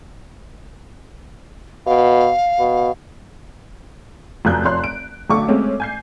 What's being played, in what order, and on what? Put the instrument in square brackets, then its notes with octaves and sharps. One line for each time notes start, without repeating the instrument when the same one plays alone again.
[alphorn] B2 [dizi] F5
[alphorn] B2
[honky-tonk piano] F1 F#2 F#6 G6
F1 C#5 C6 F#6
D7
B1 D3 A3 C#6 D6
G#3 A3 C4 C#4
G#5 G6 C7